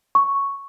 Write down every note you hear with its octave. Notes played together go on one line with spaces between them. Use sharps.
C#6